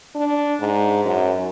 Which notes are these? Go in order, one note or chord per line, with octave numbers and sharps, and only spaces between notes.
D4
G#2
F#2